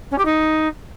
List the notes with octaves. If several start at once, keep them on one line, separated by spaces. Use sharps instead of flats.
C#4
G4
D#4